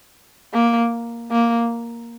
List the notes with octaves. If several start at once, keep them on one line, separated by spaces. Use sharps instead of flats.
A#3
A#3